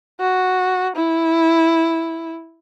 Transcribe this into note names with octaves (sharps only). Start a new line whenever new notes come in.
F#4
E4